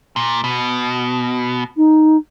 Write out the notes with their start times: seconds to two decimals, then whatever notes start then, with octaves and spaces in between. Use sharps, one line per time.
0.16 A#2
0.44 B2
1.77 D#4